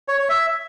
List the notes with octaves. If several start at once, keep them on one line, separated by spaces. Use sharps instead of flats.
C#5
C#5
E5